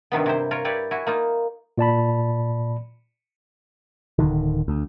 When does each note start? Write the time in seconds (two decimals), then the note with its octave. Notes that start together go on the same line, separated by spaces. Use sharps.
0.12 G2 C3 D#3 B3
0.26 C3 E4 C5
0.51 F4 A#4 C#5
0.65 E4 G4 B4 C#5 D5
0.91 E4 F#4 G#5
1.07 A#3 D#4 F4
1.78 A#2 D5 A5 B5
4.19 D1 D3 D#3
4.68 D2